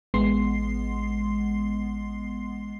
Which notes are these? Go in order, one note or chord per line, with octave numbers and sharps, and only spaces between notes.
A1 G#3 B3 C6 C7